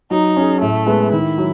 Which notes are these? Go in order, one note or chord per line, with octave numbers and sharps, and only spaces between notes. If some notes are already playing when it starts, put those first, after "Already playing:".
F#3 D#4
C#4 G#4
A2 A3
G#3 B3
D#3 E4
F#3